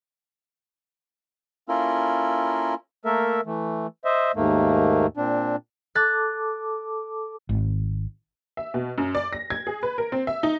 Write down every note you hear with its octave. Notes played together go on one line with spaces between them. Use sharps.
A#3 C#4 E4 F4 A4 A#4
A3 A#3 A4 A#4 E5
E3 A3
C5 D#5 E5
D#2 G#2 A3 A#3
A#2 C4 D4
A4 A5 D6 F#6 A6
G#1
E5
B2
F#2
D5
A#6
G#6
G#4
B4
A#4
C4
E5
D#4